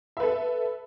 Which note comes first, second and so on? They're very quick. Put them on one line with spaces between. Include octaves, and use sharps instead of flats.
E5 B4 A4